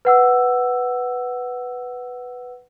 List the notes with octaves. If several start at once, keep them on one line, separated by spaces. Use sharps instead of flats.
B4 F#5 E6